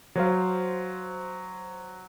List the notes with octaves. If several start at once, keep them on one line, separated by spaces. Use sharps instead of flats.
F#3 C5 F5